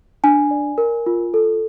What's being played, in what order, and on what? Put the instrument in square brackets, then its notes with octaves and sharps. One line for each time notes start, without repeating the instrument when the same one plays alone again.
[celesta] D4 G#5
D5
A#4
F4
A4